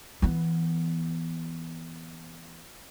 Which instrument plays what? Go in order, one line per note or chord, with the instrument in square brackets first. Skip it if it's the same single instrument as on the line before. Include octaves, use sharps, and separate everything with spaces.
[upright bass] E3 B3